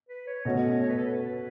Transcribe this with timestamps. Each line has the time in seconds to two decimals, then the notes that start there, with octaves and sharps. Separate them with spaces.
0.09 B4
0.27 C#5
0.45 B2 A3 C#4 F#4 D#5
0.81 C#5
0.89 B4
0.98 A4
1.07 B4